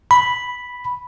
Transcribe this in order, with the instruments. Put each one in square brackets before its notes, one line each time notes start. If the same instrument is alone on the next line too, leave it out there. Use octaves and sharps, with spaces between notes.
[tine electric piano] B5